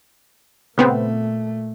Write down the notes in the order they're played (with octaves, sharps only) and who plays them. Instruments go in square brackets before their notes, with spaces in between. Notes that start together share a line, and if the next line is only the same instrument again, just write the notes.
[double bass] A#2 A3 [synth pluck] C#3 B3 C4